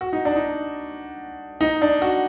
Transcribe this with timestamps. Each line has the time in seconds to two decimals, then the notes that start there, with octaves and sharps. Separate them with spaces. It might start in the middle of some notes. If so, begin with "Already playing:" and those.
0.01 F#4
0.13 D#4
0.25 D4
0.36 D#4
1.61 D#4
1.82 D4
2.02 F#4